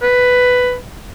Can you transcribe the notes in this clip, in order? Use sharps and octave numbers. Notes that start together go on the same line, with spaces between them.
B4